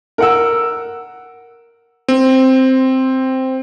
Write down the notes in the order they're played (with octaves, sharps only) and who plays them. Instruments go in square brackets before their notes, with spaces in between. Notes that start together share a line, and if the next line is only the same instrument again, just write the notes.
[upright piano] A#4 F#5 E6
[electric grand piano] C4